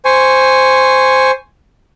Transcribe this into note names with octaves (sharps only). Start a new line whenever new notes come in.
C5 G#5 C#6